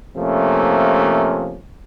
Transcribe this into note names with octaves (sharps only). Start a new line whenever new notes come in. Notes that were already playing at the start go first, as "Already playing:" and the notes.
C3 F3 A3 A#3 C#4